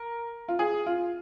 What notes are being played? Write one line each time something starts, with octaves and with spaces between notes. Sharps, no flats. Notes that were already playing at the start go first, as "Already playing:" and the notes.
Already playing: A#4
F4
G#4
F4